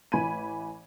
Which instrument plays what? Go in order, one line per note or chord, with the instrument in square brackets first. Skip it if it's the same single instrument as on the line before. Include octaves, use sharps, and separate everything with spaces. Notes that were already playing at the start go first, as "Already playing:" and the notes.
[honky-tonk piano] A1 E3 G#5 B5 G#6 D#7